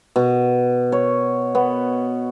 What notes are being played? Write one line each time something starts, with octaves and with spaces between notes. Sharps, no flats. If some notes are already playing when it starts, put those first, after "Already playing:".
B2
C#5
B3